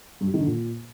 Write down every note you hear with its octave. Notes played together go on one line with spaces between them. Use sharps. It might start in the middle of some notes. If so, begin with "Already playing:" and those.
G2
G3
D#3
D3
A#2